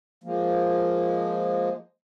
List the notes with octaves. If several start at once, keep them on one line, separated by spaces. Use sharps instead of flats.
F3 G#3 A#3